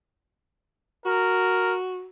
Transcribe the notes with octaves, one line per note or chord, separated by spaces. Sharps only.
F#4 A#4